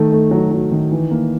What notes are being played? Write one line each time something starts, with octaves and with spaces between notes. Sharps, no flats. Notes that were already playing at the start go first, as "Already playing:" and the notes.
Already playing: D#3 A3
A3
F#3
F#3
D#3
E3
A#3